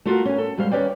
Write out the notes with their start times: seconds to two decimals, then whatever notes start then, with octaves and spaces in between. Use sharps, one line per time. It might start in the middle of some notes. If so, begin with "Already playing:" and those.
0.05 A3 F4 F#4 A#4
0.25 C#4 G#5
0.38 A4
0.57 F#2 G3 G#3 C5 F5
0.72 D#2 C#4 B4 D5 G5